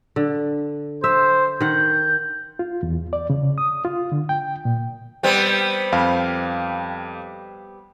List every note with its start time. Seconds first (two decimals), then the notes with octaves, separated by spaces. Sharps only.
0.16 D3
1.04 C5 E5
1.61 D#3 F#5 G6
2.59 F4
2.83 E2
3.13 D5
3.30 C#3
3.58 D#6
3.85 F4
4.12 D3
4.29 G5
4.65 A#2
5.23 G3 B3 C4
5.93 F2 F5 B5